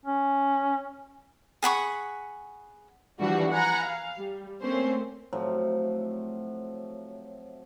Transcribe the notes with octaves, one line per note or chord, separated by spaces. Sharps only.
C#4
G#4 F#5 B5 C#6
E3 F3 G3 D4 F#4
F#5 G#5 A#5 B5
F5
G3
A3 A#3 C4 C#4 C5
A2 C3 F3 F#3